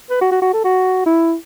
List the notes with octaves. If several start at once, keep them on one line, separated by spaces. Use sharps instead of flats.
B4
F#4
F#4
F#4
A4
F#4
E4